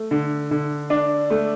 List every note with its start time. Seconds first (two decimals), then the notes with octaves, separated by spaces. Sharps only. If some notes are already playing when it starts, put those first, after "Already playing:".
Already playing: A3
0.11 D3
0.51 D3
0.90 D4
1.30 A3